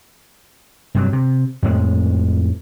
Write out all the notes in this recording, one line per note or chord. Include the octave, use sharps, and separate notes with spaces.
G2 C3 F#3
C3
F2 A2 G#3